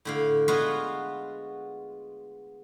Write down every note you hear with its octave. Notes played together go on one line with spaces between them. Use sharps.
A2 D3 F5
G#3 B3 F4 F#4 F5 F#5